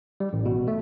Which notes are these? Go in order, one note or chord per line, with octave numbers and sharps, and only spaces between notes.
G3
A1
B2
A3